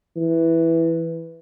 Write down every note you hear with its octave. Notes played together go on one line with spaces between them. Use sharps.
E3